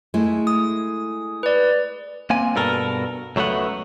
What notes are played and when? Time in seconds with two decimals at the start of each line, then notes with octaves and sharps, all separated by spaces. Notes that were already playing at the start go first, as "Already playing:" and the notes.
0.14 G#3 A3 E4
0.47 D#6
1.43 B4 D5
2.30 A#3 C4 G#5
2.55 G2 B2 A4 A#4
3.36 C#2 F#3 A3 B3 F#5